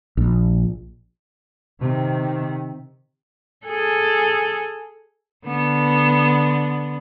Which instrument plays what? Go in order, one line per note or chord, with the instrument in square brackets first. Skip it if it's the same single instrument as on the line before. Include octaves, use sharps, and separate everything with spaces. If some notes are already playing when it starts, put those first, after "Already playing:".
[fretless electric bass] A#1
[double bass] C3 D#3
[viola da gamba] G#4 A4
D3 B3